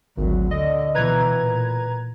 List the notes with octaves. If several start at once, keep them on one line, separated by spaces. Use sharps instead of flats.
G#1 D2 F#3
D3 D#5
B2 E3 B4 A#5 G#6
A#2